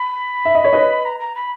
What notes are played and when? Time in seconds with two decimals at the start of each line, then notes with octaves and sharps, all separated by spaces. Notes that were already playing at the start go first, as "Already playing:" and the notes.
Already playing: B5
0.45 E5
0.55 D#5
0.64 C#5
0.73 B4 D#5
1.05 A#5
1.20 A#5
1.35 B5